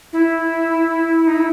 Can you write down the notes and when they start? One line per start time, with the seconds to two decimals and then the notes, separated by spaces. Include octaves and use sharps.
0.13 E4
1.27 D#4
1.34 E4